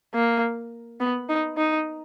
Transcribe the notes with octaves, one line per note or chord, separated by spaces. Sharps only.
A#3
B3
D#4
D#4